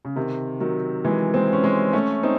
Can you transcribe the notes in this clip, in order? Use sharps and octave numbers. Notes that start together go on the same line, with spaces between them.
C#3
C3 D#3
D#3 F#3
E3 G#3
G#3 C4
C#4
G#3 C4
A3 C#4
C4 D#4